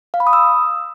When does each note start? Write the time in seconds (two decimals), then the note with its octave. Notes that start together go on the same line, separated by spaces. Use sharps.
0.14 F5
0.20 B5
0.27 D#6
0.33 E6